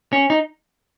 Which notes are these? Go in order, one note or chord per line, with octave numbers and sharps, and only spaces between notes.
C#4
D#4